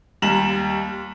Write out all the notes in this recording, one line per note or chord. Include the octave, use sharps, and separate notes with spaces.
D#2 G3 G4 A#5 E7 F#7